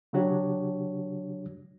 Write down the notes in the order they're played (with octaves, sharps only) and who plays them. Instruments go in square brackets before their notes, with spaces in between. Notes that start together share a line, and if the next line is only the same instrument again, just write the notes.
[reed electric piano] C#3 F#3 D4 F#4 G4 C#5